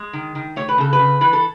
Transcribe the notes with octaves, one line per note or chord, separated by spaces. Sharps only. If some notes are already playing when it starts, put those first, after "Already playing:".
Already playing: G#3
D#3
D#3
A3 C#5
B4
C#3 A4
B4
C#3
E3 B4
A4